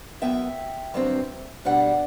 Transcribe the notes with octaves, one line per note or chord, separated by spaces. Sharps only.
F#2 F#3 B3 E5 G5
G2 D3 F#3 C4
B2 G3 D4 D5 F#5